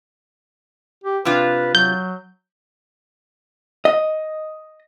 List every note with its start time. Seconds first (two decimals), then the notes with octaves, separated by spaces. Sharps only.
1.04 G4
1.25 C3 D4 F4 B4
1.75 F#3 G6
3.85 D#5